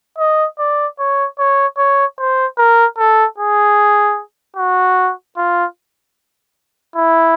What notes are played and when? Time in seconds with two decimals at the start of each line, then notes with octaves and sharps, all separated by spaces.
0.18 D#5
0.59 D5
0.99 C#5
1.39 C#5
1.78 C#5
2.18 C5
2.58 A#4
2.98 A4
3.38 G#4
4.56 F#4
5.37 F4
6.96 E4